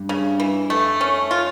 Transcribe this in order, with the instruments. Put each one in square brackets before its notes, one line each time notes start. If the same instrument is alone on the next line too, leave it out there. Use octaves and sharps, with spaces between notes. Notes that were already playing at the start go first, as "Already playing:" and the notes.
Already playing: [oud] G2
[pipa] C#3
E3
[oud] F2 [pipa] A3
[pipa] C#4
F4